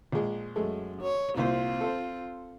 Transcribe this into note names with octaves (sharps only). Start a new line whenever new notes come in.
A#1 G#3
F#2 G#3 A3
C#5
C2 A#2 C4 F4 C5
A4 C5